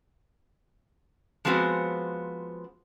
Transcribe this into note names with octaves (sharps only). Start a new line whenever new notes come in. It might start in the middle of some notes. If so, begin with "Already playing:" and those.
F3 G#3 B3 C4 F#4